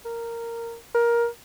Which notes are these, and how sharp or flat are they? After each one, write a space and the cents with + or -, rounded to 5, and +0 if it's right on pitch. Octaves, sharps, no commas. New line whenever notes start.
A#4 -10
A#4 +15